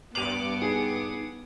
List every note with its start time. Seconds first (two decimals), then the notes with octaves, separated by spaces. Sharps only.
0.15 G2 B3 D6 D#7 F7 F#7
0.62 D#4 G#4